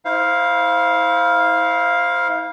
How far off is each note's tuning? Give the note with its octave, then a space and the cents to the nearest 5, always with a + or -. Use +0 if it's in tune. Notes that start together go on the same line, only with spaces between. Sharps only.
E4 -35 C5 +0 F5 +0